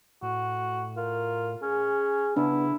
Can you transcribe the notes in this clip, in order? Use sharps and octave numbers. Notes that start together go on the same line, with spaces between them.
A2 F#4
F4 A#4
C#4 G#4
C#3 B3 D4 E4